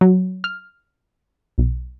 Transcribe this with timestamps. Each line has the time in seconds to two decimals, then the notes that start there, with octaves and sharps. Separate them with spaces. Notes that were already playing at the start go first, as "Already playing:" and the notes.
0.01 F#3
0.44 F6
1.58 B1